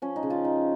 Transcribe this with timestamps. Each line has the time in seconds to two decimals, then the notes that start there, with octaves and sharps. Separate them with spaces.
0.02 F3 C#4
0.16 D#4
0.23 C#3
0.30 F4
0.44 F3 D#4